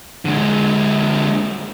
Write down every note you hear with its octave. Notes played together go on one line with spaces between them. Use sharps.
D3 G#3